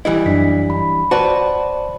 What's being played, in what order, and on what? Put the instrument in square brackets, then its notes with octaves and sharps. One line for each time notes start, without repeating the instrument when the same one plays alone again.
[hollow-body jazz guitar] E3 G3 E4 [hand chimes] D#5
[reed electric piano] F#2 [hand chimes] D4 B6
[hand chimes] B5
[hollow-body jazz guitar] F#4 B4 [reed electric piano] C5 D5 A5